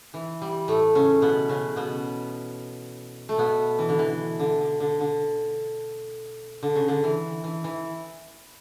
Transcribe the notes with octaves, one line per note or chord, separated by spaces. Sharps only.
E3
G3
A2 A3
C#3 C#4
B2 B3
C#3 C#4
B2 B3
A3
B2 B3
E3
D3
E3
D3
D3
D3
D3
D3
C#3
D3
E3
E3
E3